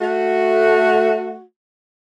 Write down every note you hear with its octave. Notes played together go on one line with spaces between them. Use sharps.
A3 F#4